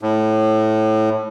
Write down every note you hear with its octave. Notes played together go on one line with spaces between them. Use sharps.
A2